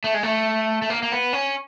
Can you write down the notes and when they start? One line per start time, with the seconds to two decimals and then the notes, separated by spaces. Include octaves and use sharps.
0.04 A3
0.14 G#3
0.23 A3
0.82 A3
0.90 A#3
1.03 A#3
1.12 B3
1.33 C#4